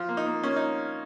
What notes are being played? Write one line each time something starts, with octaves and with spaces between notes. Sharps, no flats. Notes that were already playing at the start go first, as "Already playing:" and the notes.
Already playing: F3 F4
A#3
D#4
A#3
A#3 C#4
D#4